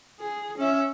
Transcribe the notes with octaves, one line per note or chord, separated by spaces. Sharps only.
G#4
C#4 E5